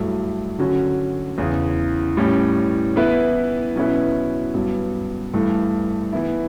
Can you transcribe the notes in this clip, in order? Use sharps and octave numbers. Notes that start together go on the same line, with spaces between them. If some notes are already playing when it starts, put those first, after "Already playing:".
Already playing: G2 F#3 A3 E4
D3 F#3 C#4 F#4
E2 C#3 E3
A2 G3 C#4
E3 B3 E4 B4
B2 F#3 C#4 E4 B4
G2 F#3 B3
G2 E3 A3
E3 B3 E4